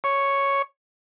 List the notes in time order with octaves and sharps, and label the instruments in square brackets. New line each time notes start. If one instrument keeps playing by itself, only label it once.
[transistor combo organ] C#5